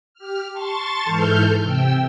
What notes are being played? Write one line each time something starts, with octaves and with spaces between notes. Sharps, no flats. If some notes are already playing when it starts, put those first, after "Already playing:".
G4 F6
A5 C6 C#6 A6
G#2 E3 A4 F6 G6
C3 G5 E6